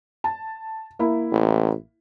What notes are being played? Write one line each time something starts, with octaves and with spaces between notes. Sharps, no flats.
A5
A#3 E4
A1